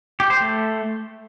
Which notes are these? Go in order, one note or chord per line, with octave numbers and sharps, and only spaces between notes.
G4
C5
A3